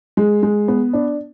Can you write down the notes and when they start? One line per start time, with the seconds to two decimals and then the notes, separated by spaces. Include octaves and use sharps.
0.17 G#3
0.43 G#3
0.68 B3
0.93 D4